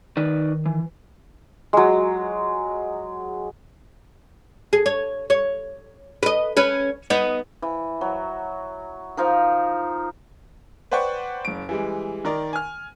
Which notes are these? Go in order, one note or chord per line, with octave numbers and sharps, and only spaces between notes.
D#3 D#4 B4 D5
E3
F#3 G#3
G#4
C#5
C#5
B4 D#5
C#4 B4
B3 D#4
E3
F#3
F3 D#4 A#4
B4 C5 D5 F#5 G5 C#6
F#1 D7
E3 G3 G#3
D#3 A#4 D5
G#5 F6